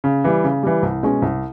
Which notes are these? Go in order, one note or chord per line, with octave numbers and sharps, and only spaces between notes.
C#3
E3 G3
C#3
E3 G3
C2
B2 G#3 C#4
C2